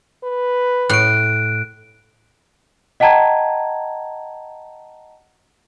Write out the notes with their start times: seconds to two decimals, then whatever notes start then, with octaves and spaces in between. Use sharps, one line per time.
0.24 B4
0.90 A2 F#6 D7
3.00 D#5 F#5 G5 A5 A#5 G#6